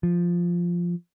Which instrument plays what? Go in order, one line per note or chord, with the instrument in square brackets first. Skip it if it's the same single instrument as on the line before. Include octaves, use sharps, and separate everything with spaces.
[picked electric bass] F3